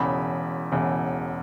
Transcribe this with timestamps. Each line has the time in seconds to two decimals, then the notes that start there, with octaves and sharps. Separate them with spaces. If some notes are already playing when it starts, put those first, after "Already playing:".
Already playing: E1 E2 C#3 B5
0.72 E1 E2 C#3